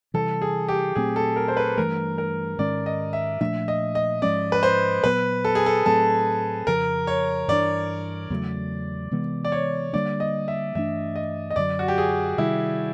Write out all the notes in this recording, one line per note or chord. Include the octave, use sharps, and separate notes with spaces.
C3 E3 G3 A4
G#4
G4
A#2 F#3 A3 C4 G#4
A4
A#4
C5
B4
G2 E3 A3 A#4
A#4
G#2 D#3 G#3 C#4 D5
D#5
E5
A#2 F3 A3 D4 E5
D#5
D#5
G#2 F3 G#3 C#4 D5
B4
C5
A#2 F#3 B3 B4
A4
G#4
A4
A2 F#3 A3 C4 A4
F2 C#3 F3 A#4
C#5
G2 E3 A3 D4 D5
E2 C#3 F#3 A3
C3 E3 G#3 B3
D5
C#5
D3 G3 A#3 D4 D5
D#5
E5
G2 E3 A3 D4 E5
D#5
D#5
F#2 D3 F#3 D5
F#4
G4
G#4
C3 D#3 G3 E4